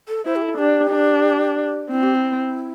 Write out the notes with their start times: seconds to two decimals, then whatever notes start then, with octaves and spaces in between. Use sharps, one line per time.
0.08 A4
0.25 E4 C5
0.36 G4
0.41 A4
0.58 D4 G4
0.91 D4
1.91 C4 E4
2.02 G4
2.15 E4